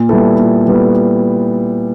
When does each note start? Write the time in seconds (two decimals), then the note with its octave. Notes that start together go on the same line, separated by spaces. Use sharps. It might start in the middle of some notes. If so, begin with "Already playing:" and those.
Already playing: A#2
0.09 G3 B3 E4 A4
0.39 A#2
0.68 G3 B3 E4 A4